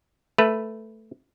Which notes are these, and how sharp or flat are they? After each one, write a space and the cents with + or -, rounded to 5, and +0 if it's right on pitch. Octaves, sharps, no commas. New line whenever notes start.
A3 +0 B4 +0